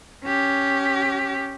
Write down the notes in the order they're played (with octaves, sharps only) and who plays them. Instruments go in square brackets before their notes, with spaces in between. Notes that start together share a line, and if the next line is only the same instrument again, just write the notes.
[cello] C#4 G4